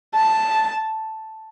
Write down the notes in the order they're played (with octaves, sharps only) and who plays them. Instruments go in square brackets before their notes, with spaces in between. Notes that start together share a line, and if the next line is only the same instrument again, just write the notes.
[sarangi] A5